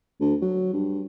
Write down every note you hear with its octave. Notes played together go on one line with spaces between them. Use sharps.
D2
F#3
G2